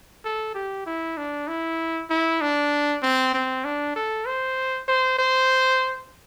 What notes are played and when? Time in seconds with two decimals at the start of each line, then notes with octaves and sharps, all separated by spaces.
0.24 A4
0.54 G4
0.86 E4
1.17 D4
1.47 E4
2.10 E4
2.41 D4
3.02 C4
3.34 C4
3.64 D4
3.96 A4
4.27 C5
4.88 C5
5.18 C5